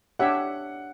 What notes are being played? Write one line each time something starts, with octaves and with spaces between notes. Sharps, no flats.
D4 G4 C#5 E5 F#5